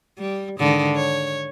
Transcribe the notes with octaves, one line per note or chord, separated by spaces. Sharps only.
G3
G#2 D3 D#3
C#5